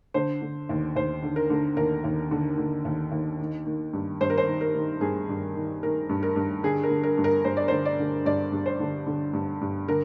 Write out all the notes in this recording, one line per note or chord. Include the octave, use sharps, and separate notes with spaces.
D3 C5
D3
D#2
D#2 C5
D3
A#4
D3
D#2 A#4
D#2
D3
D3
D#2
D#2
D#3
D#3
G2
G2 C5
A#4
C5
D#3
A#4
D#3
G2 G#4
G2
D#3
D#3 A#4
G2
A#4
G2
D3 G#4
A#4
D3
A#4
G2
A#4
G2 C5
D5
D3 C5
D5
D3
G2 D5
G2
C5
D3
D3
G2
G2
D3 A#4